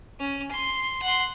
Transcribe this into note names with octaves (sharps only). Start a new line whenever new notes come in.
C#4
C6
F#5 C6